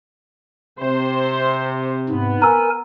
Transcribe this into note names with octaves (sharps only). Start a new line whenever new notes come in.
C3 C5
G#2 B3
A#4 G#5 A#5 E6